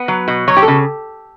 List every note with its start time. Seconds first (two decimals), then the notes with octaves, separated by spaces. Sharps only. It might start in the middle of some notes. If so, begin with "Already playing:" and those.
Already playing: B3
0.08 F#3
0.28 B2
0.48 F#3 C#5
0.57 G4
0.62 A4
0.68 C#3